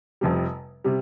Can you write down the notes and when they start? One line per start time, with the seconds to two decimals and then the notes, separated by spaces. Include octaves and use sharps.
0.21 F1 F2 C3 G3
0.84 C3 G3